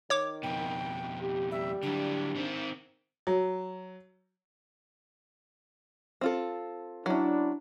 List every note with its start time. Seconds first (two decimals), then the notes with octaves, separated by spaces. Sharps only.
0.10 D#3 C#5 D6
0.43 F2 B2 G5
1.21 G4
1.51 G3 E5
1.83 D3 F#3 D4
2.36 D#3 C4
3.27 F#3
6.21 C4 F4 A4
7.06 F#3 C#4 D4 E4